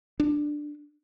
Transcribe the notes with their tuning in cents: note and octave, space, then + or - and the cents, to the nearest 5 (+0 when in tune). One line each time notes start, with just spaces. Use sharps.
D4 +10